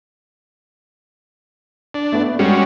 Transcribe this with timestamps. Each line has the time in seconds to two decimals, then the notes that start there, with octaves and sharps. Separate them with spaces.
1.94 D4
2.12 A3 B3
2.39 G3 G#3 C#4 F#4